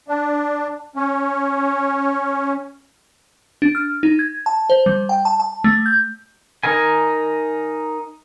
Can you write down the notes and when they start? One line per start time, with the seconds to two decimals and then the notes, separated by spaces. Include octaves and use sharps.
0.08 D4
0.96 C#4
3.62 D4
3.75 F6
4.03 D#4
4.19 G#6
4.46 A5
4.70 C5
4.86 G3
5.09 G5
5.25 A5
5.40 A5
5.64 A3
5.86 G6
6.63 D#4 A#4 G#5